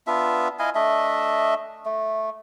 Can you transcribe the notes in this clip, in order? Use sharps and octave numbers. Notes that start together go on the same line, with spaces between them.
B3 D4 F4 E5
E4 D#5 F5 G#5
A3 D4 D#5 E5
A3